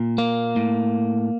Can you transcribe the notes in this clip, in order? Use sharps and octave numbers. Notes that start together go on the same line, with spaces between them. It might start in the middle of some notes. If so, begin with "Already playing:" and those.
Already playing: A#2
A#3
A2